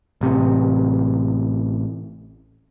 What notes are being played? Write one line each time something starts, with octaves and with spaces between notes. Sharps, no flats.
A1 C3